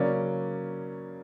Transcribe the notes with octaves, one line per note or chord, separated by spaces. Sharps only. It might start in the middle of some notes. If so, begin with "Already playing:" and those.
Already playing: C#3 F#3 A#3 C#4 D5